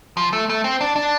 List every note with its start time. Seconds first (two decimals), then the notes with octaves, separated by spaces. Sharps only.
0.17 F3
0.33 A3
0.49 A3
0.64 C4
0.81 D4
0.96 D4